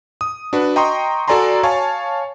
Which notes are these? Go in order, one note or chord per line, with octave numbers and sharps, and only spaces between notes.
D#6
D4 F#4 B4
D#5 G5 A#5 C6 C#6 D#6
F#4 A4 D5 G#5 A#5 C6
C#5 F5 G#5 A5 C#6